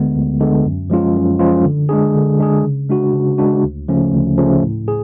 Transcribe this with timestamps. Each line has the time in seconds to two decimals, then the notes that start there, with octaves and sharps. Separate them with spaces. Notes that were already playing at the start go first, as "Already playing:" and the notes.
Already playing: D2 D3 G#3 B3
0.15 D2
0.41 D3 G#3 B3
0.65 F#2
0.90 F3 G#3 C#4 F4
1.16 F#2
1.39 F3 G#3 C#4 F4
1.65 D3
1.89 G#3 D4 G#4
2.14 D3
2.39 G#3 D4 G#4
2.63 C#3
2.89 G#3 D4 F#4
3.13 C#3
3.38 G#3 D4 F#4
3.63 D2
3.88 C#3 F3 A3 C#4
4.14 D2
4.38 C#3 F3 A3 C#4
4.62 A2
4.88 G#4